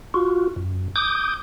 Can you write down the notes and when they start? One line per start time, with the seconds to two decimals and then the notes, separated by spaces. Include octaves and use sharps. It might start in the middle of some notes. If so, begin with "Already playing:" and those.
0.14 F4 F#4
0.56 F#2
0.96 D6 D#6 G6